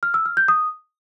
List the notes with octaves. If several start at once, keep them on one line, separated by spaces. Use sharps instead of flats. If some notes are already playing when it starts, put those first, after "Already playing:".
F6
E6
F6
G6
D#6